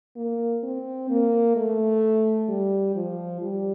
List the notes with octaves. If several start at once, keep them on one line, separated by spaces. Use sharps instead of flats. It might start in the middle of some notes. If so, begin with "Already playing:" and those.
A#3
C4
A#3
A3
G3
F3
G3